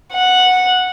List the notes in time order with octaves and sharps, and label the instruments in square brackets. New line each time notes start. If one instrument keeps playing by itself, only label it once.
[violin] F#5